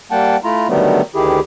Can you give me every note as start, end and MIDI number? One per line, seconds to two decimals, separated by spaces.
0.11 0.36 55
0.11 0.36 58
0.11 0.36 78
0.11 0.36 79
0.11 0.36 81
0.44 0.68 57
0.44 0.68 64
0.44 0.68 65
0.44 0.68 82
0.68 1.01 50
0.68 1.01 51
0.68 1.01 54
0.68 1.01 55
0.68 1.01 57
0.68 1.01 59
1.15 1.40 38
1.15 1.40 51
1.15 1.40 64
1.15 1.40 67
1.15 1.40 68